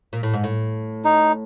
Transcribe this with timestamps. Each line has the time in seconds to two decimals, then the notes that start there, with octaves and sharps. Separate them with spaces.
0.13 A#2
0.23 A2
0.33 G#2
0.44 A2
1.05 D#4